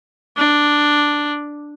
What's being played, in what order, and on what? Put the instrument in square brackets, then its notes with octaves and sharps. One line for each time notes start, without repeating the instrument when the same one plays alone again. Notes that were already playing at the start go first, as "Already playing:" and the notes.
[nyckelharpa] D4